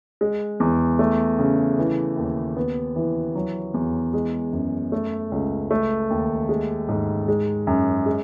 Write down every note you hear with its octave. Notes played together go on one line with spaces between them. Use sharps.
G#3
E2
A3
C#3
E3
D#2
B3
E3
F#3
E2
G#3
F#2
A3
C#2
A3
D#2
G#3
G#2
G#3
F#2
G#3